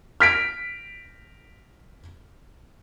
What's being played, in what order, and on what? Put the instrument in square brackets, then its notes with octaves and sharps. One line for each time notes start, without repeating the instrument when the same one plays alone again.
[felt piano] F6 B6 D7